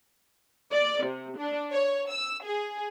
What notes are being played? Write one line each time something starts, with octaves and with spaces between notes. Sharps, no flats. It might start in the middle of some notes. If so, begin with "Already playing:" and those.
D5
C3
D4
C#5
E6
G#4